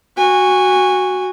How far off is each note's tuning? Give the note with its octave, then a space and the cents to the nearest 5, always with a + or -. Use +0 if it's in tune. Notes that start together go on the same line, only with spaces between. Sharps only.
F#4 +0 G#5 -20